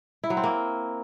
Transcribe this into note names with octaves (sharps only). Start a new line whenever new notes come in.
E4
F#3
C4
A#3